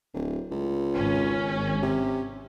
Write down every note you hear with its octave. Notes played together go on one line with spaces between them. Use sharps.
D1
C#2
G#1 C#4
C3